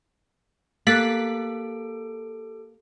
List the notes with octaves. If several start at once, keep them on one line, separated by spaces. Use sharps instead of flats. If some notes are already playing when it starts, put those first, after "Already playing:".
A#3 G4 A4 F#6 A6 B6 D7